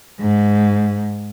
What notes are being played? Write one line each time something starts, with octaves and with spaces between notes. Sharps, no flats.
G#2